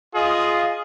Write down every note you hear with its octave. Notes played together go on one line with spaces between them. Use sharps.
F4 G#4 D#5